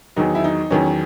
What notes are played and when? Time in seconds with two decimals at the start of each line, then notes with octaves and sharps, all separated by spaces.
0.16 E2 D#3 F#3 D#4
0.35 E4
0.44 D#4
0.70 E2 D#3 F#3 C#4